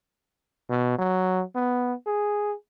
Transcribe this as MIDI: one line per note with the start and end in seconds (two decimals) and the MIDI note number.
0.70 0.95 47
0.98 1.43 54
1.55 1.93 59
2.06 2.54 68